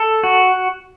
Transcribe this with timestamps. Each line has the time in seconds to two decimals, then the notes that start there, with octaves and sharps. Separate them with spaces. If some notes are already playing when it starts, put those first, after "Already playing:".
Already playing: A4
0.23 F#4